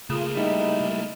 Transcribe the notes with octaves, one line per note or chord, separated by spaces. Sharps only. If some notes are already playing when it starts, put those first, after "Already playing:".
C#3 A3 A#3 F4
G3 D#4 E4